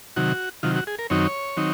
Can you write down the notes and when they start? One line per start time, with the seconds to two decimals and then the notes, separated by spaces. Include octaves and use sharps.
0.16 C3 D#3 F#3 F#4
0.63 C3 D#3 F#3 F4
0.76 F#4
0.87 G#4
0.99 A#4
1.10 F#2 D#3 F#3 C4 D#4 C#5
1.57 D#3 F#3 C4 D#4